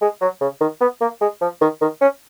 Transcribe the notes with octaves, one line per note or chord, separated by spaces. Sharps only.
G#3
F#3
C#3
D#3
B3
A#3
G#3
F3
D#3
D#3
C#4